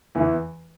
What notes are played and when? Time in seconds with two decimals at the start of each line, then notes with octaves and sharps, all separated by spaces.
0.15 E2 E3